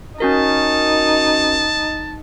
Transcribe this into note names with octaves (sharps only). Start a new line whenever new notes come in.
C#4 D#4 F#4 A#4 A5